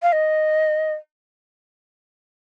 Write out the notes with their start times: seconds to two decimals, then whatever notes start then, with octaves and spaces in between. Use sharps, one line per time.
0.03 F5
0.13 D#5